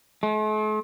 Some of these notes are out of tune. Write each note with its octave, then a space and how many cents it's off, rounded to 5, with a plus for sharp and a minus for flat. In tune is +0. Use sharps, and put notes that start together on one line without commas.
A3 -45